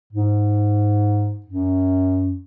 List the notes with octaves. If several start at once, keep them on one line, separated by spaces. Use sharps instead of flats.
G#2
F#2